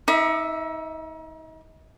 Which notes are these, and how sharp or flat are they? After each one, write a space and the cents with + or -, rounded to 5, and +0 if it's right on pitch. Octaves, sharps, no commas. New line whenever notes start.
D#4 +35 E5 +0 D#6 -40